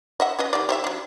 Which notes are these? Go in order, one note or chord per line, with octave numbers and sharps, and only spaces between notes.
D#5 E5 F#5
C#4 B4 D#5
D#3 G4 D5
G4 C5 E5
F#3 D4